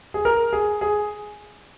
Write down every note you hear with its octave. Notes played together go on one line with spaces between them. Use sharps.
G#4
A#4
G#4
G#4